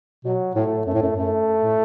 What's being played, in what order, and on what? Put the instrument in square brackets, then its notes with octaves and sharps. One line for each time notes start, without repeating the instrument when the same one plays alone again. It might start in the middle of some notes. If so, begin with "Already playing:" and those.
[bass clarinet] B2 [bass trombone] F#3
[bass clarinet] A2 [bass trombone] A3
[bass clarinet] F#2 [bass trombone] A3
[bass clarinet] A2
F#2
[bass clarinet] F#2 [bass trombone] A3
[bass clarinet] A2